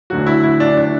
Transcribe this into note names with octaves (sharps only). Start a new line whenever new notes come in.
D2 D3 F#3 F#4
E4
E4
D4
D4